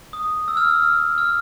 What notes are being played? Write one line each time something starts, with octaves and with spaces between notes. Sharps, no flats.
D#6
E6
F6
E6
F6
F6